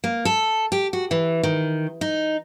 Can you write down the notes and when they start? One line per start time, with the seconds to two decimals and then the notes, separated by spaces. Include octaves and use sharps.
0.04 A#3
0.25 A4
0.72 G4
0.93 F#4
1.11 E3
1.43 D#3
2.01 D#4